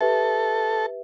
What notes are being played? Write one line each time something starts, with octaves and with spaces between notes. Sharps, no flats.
G4 A4 B4 E5